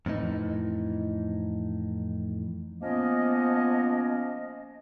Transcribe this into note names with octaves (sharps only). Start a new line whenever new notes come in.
F2 A2 E3 D#4
F3 A#3 B3 C#4 D#5